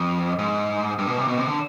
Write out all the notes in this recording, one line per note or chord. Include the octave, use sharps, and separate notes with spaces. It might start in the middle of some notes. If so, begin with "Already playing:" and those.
Already playing: F2
G#2
G2
B2
C3
B2
C3
D3